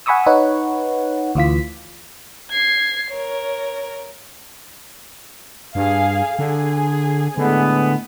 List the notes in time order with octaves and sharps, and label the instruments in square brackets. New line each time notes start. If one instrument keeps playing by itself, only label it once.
[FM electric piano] F#5 G#5 B5 C#6 D#6 E6
D#4 B4 C#5 F#5
D2 E3 F4 B6
[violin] G#6 C7
A#4 C#5
[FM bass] G2 [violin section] G#4 F5
[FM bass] D3 [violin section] G#4
[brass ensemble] A2 G#3 B3 [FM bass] D3